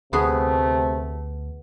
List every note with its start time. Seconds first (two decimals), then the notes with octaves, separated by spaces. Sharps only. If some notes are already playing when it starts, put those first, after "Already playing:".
0.13 D2 C3 A3 B3 F#4 G#4